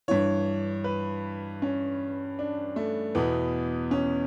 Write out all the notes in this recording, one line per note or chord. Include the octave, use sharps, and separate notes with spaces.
G2 E3 C#5
B4
C#4
D4
A3
E2 B2 B3
C#4